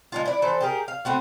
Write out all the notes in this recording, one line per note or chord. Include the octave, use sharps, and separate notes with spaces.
G#3 D4 F4
E4 D5
E3 A4 C5
G4 G#4 A#4
F5
A3 B3 C4 F#4